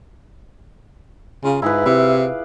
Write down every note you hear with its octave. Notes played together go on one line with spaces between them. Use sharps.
C#3 F4
G#2 E4 G#4 B4
C3 E4 D6
F5